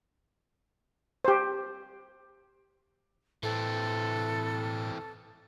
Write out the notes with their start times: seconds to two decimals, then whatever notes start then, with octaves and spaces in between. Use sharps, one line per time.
1.25 G4 C5
3.43 A2 E3 C4 A4